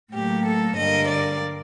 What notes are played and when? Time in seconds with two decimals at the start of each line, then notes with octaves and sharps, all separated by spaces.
0.14 A2 F#3 A#3 G4
0.46 A4
0.77 G2 D3 G3 A#3 D#5
1.09 D5